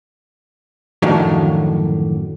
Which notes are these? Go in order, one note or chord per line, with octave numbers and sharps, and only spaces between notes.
F#2 A2 D3 D#3 F3 F#3